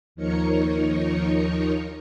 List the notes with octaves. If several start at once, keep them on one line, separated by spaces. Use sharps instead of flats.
D#2 F3 D#4 A#4 C#5 C#7